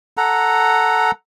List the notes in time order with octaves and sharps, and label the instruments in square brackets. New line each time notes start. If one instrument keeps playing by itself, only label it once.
[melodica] A4 F#5 A#5